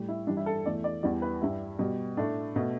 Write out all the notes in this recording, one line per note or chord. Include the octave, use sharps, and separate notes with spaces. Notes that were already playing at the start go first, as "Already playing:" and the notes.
Already playing: A2 G3
E4
G2 E3 G3 D4
E4
A4
E2 E3 A3 D5
D5
E2 E3 G3 D5
B4
G2 G3 E4
B2 G3
A2 A3 D4
B2 A3